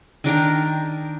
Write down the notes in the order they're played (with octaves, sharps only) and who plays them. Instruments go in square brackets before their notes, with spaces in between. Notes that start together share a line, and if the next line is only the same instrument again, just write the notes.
[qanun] D#3 D4 A#4 G5